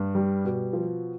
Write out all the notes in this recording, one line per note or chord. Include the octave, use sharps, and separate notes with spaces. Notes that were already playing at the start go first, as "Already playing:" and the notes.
Already playing: G2
G3
B2
F3